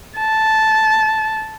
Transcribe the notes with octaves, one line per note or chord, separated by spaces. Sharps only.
A5